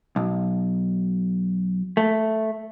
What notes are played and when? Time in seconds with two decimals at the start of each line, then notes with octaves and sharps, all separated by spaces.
0.16 B1
1.97 A3